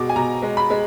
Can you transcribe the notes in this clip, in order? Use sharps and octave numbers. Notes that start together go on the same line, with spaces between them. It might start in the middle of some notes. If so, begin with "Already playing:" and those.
Already playing: B2 G#3 D6
G#5
B2 A#5
G#3
B5
G#3